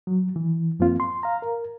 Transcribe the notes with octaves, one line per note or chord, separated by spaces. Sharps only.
F#3
E3
F#2 F3 A#3 C4 F4
C6
F5 A#5
A#4